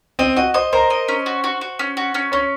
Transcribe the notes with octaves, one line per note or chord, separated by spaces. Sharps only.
C4 D#5
F#4 D#5
C5 D#5
A#4 C5
D#5
C#4
F#4
F#4
F#4
C#4
F#4
C#4
C#4 C#5